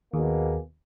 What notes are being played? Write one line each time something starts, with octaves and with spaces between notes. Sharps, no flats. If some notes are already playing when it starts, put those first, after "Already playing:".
D#2 B2 A#3 G#4